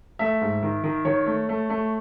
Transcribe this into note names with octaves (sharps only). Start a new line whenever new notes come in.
A3 E5
G#2
D#3
D#3
D#3 C#5
A3
A3
A3